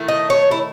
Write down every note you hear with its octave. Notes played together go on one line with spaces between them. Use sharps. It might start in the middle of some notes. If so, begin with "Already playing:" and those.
Already playing: D#3 A3 E4
D#5
C#5
E4